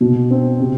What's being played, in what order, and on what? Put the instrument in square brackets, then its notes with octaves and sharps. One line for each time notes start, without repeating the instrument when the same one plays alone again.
[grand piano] B2
C4
C3